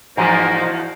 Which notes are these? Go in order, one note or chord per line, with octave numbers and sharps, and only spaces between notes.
E2 G#2 F3 A#3 D#4 F#4 C5